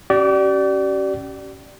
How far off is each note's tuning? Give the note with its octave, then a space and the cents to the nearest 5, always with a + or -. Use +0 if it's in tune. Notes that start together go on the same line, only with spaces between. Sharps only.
C#4 +0 G4 -40 D5 +0